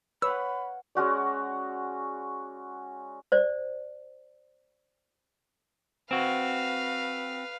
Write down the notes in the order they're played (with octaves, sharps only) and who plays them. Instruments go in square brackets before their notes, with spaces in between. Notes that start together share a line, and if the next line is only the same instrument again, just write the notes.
[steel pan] B4 [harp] C#5 F5 F#5 [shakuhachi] B5 [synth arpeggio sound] E6
[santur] G#3 C#4 F#4 D5
[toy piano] C5 D5
[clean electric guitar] C4 F#4 [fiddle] B4 F5